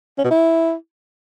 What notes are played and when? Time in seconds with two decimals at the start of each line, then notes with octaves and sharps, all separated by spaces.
0.18 C#4
0.24 B2
0.30 E4